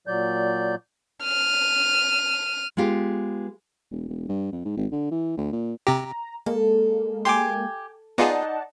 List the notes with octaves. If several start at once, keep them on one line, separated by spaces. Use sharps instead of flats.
A#2 F#3 D5 G6
F6 D#7
G#3 B3 F4 G4
E1
E1
G2
F2
G#2
G#1
D3
E3
D2
A#2
C3 G4 A#5
G#3 A#3 A4
G4 G5 G#5 C6 D6
B3 D#4 F4 G#4 D5 D#5 F#5 A5